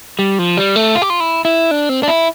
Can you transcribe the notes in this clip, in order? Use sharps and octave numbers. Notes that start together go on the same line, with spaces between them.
G3
F3
G3
A3
F4
G4
F4
E4
E4
D4
C4
D4
E4